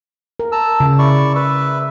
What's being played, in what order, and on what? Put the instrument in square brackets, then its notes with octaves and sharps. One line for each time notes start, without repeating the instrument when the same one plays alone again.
[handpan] A#4
[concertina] A5 A#5 E6
[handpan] C#3
[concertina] E4 D5 C#6
B4 E5